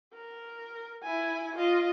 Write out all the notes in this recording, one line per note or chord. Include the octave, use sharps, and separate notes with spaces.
A#4
E4 G#5
F4 D#5